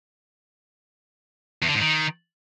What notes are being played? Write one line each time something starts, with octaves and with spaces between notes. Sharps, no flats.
E2
D3
G#2
D#3